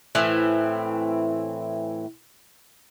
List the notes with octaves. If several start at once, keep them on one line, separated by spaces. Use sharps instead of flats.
A2 E3 C4